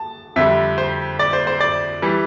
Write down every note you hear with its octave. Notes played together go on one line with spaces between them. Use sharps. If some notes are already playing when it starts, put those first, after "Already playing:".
Already playing: A5
F2 D3 G3 E5
C5
D5
C5
C5
D5
E3 G3